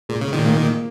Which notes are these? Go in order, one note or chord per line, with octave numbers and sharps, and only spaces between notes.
A#2 G#3
C#3
A#2 D#3
A#3